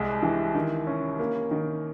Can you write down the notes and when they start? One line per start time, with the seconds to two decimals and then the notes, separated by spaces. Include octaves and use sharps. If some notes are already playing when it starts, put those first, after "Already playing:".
Already playing: C2 G#3
0.22 E3
0.55 D#3
0.87 C#4
1.19 A#3
1.51 D#3